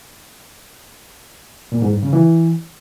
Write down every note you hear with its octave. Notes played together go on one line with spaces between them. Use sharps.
A#2
G#2
G2
C#3
E3